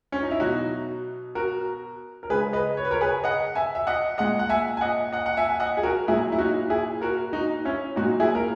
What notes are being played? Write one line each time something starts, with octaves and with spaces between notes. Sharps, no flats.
C#4
D#4
E4
B2 F#3 D#4 F#4
F#4 A#4
A#4
C#3 G#3 G#4 B4
B4 D#5
C#5
B4
A#4 C#5
G#4 B4
D#5 F#5
E5 G#5
E5
D#5 F#5
A#2 G#3 D#5 F#5
F#5
E5 G#5
G#5
D#5 F#5
D#5 F#5
F#5
E5 G#5
G#5
D#5 F#5
G#4
F#4 A#4
A#2 F#3 E4 G#4
E4
D#4 F#4
E4 G#4
F#4 A#4
D#4 F#4
C#4 E4
A#2 F#3 D#4 F#4
E4 G#4
A#4